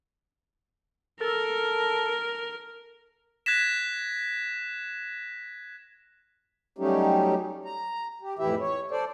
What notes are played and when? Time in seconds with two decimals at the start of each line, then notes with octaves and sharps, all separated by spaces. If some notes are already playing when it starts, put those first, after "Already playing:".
1.21 A4 A#4
3.46 F#6 G#6 A#6 B6 E7
6.78 F#3 G3 A3 C#4 D#4 G4
7.65 A#5
8.21 G4
8.39 F2 A2 E3 E4 G4 E5
8.60 C#5
8.91 A4 C5 D5